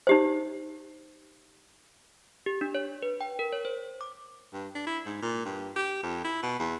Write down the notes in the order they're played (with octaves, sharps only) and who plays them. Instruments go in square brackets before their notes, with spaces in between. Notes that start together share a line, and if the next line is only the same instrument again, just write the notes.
[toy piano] D#4 G4 C5
[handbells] G4
D4
C#5
B4
G5
A#4
C#5
C5
D6
[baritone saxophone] G2
D4
E4
G#2
A#2
G2
G4
F2
E4
B2
E2